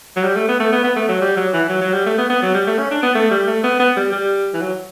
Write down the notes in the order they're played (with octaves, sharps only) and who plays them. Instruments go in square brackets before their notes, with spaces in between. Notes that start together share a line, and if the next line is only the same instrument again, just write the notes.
[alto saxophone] F#3
G3
A3
B3
A3
B3
B3
A3
F#3
G3
F#3
E3
F#3
F#3
G3
A3
B3
B3
F#3
G3
A3
C#4
D4
B3
A3
G3
A3
B3
B3
G3
G3
E3
F#3